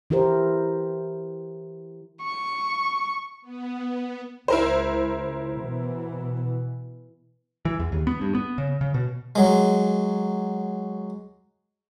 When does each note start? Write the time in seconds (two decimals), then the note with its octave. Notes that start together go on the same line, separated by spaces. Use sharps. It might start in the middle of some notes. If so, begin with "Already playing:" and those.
0.10 E3 E4 G4 A#4 C5
2.23 C#6
3.42 B3
4.48 C#2 E4 A#4 C5
5.57 B2 E3 B3
7.65 E3
7.79 E2
7.92 D#2
8.07 B3
8.21 G2
8.35 B3
8.58 C#3
8.81 C#3
8.94 B2
9.35 F#3 G#3